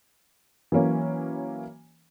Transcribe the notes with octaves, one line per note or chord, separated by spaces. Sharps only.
E3 F#3 A#3 C#4